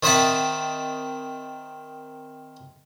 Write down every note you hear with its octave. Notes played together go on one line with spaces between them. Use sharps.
D#3 C4 D#5 E5 F#5 A5